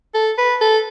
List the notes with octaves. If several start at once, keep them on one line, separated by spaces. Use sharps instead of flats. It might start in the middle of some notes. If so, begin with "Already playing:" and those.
A4
B4
A4